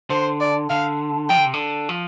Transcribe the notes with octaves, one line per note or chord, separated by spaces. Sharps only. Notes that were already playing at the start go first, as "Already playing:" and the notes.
D3 C5
D5
D3 F5
F3 G5
D3
C3
D3
F3